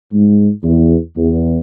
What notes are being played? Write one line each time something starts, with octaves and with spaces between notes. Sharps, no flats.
G#2 G#3
E2
E2